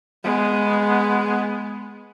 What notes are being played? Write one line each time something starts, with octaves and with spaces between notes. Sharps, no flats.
G#3 B3